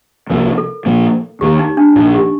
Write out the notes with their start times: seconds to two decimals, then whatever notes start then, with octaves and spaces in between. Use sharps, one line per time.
0.30 C2 C3 F3 A#3 A#4
0.58 A4
0.85 A#2 F3 A#3
1.41 D#2 D#3 A#3 G4
1.59 D#4
1.77 D4
1.96 A#2 F3 A#3 D#4
2.15 G4